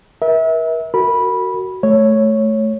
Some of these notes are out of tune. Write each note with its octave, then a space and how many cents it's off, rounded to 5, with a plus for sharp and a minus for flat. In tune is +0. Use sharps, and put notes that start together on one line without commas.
A#4 +45 E5 -30
F#4 +10 A#4 -25 B5 -15
A3 -15 C#5 +0